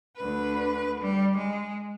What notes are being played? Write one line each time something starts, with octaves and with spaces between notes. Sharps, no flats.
D2 B4
G3
G#3